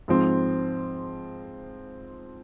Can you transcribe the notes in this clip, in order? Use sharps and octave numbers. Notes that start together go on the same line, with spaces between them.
G#2 F3 C4